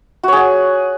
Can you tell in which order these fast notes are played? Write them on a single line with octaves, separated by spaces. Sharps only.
F#4 C#5 G#4 F#5